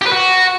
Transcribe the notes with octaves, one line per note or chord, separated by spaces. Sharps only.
G4
B4
F#4